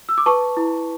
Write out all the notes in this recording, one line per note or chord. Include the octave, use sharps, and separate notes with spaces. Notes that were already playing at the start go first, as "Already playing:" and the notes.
E6
D6
B4 A5 C#6
E4